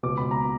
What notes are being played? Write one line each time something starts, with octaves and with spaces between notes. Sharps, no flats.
C#2 B2 D6
B5
A#5